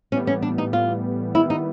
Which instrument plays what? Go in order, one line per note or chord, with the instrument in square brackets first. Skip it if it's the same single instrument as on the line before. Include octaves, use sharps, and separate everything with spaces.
[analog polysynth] A2 E3 G3 B3 [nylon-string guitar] C#4
[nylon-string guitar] C#4
D4
D#4
F4
[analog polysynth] D#3 G3 B3 [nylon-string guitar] E4
[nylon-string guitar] D#4